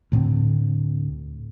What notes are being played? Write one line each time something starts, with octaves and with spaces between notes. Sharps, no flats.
D2 A2 D3 C4